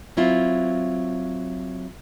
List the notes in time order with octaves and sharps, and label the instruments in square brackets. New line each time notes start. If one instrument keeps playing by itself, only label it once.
[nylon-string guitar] F#3 C4 E4 F4